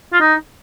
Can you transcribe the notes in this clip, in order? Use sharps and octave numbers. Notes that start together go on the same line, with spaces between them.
F4
D#4